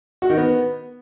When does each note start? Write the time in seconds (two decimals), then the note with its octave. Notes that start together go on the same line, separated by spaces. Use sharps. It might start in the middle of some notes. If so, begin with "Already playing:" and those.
0.22 F#4
0.30 D#3
0.37 B3